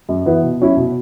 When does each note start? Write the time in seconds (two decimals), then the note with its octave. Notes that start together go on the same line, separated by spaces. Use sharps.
0.09 F#2
0.26 E3 B3 E4 B4
0.43 B2
0.60 F#3 C#4 E4
0.77 B2